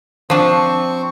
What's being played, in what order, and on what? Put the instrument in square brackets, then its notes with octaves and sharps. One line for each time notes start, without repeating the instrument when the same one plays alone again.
[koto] F3 D4 [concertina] C4 C#6